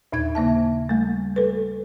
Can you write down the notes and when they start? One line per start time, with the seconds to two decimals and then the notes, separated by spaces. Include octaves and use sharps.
0.12 D#2 A#2 D#4 G#6
0.35 C#3 A#3 E5 A5
0.89 G3 A3
1.36 A4 B4